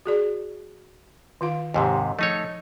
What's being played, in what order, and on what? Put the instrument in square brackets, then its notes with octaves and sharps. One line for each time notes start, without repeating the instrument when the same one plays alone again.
[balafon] F#4 G#4 D5
D#3 F4 F5
[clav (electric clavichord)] D#2 G#2 C3 [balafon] G4 G#5
[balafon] F3 [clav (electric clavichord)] A3 D#4 C#5